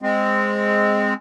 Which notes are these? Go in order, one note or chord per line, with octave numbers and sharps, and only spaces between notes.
G#3 C4